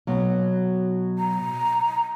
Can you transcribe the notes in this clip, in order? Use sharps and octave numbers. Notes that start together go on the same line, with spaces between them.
B2 F#3
A#5